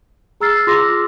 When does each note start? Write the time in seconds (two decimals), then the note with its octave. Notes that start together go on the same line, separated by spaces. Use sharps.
0.40 G#4 A#5 E6 F6 A6 C7
0.67 F4 G#4 C6 D6 E6 A#6